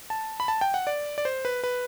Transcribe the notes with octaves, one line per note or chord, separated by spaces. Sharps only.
A5
B5
A5
G5
F#5
D5
D5
C5
B4
B4